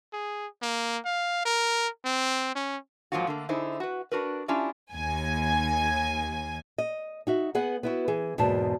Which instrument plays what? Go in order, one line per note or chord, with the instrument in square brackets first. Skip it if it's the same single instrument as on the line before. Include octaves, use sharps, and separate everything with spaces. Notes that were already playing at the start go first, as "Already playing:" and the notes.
[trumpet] G#4
A#3
F5
A#4
C4
C#4
[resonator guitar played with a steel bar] G#2 F3 F#3 A#3 F4 F#4
D3 A3 A#3
D3 D#4 E4 G#4 C5
F#4 B4
D4 F#4 A#4 B4
C#4 D4 E4 F4 G4
[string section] D#2 G#5
[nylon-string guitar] D#5
D#4 F#4 E5
B3 G#4 B4 F#5
B3 E4 F#4
E3 G#4
E2 G#2 B2 A#3 A5